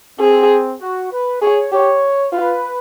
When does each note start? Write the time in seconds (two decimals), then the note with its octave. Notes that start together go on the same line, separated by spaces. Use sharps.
0.19 C4 G#4
0.81 F#4
1.11 B4
1.42 G#4 C#5
1.72 G4 C#5
2.33 F4 B4